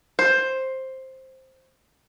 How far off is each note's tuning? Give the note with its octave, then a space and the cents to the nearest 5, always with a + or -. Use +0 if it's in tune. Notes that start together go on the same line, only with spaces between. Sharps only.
C5 +10